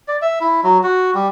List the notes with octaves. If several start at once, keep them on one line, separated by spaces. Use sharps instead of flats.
D5
E5
E4
F#3
F#4
G3